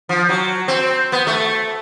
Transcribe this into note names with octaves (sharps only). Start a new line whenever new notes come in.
F3
F#3
C4
B3
A3